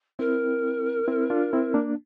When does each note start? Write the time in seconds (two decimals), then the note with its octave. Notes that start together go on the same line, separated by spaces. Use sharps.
0.19 C4 E4 A#4
1.07 C4 E4
1.30 D4 F4
1.53 C4 E4
1.74 A#3 D4